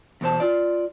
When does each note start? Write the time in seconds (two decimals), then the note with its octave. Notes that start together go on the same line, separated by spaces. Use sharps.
0.21 E2 B2 C5 A5
0.40 F4 D5